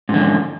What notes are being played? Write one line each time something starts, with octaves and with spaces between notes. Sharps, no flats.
F2 G#2 D3